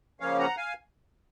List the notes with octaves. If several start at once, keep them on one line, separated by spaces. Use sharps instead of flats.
C#3 F3 A#3 C#4 C#5 F5
F#5 A#5
F5 G#5